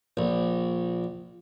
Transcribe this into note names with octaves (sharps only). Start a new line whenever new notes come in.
A#1